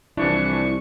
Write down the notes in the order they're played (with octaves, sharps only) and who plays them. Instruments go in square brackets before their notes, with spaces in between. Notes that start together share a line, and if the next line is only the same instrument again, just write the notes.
[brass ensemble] C2 [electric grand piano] E3 F3 D4 [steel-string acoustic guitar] E4 [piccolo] C#6